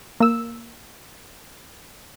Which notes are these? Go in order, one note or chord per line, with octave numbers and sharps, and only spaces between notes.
A#3 E6